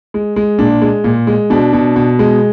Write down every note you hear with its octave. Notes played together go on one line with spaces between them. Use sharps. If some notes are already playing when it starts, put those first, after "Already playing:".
G#3
G#3
A#2 D4
G#3
A#2
G#3
B2 D4
B2
B2
G#3